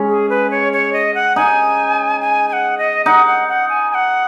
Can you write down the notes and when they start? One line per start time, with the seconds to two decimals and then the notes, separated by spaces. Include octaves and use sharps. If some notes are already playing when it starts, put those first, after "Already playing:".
Already playing: G#3 C#4
0.08 G#4
0.30 B4
0.51 C#5
0.73 C#5
0.93 D#5
1.15 F#5
1.36 D#4 G#5
2.21 G#5
2.49 G#5
2.53 F#5
2.78 D#5
3.05 D#4 F#5
3.26 F#5
3.48 F#5
3.69 G#5
3.91 G#5
3.94 F#5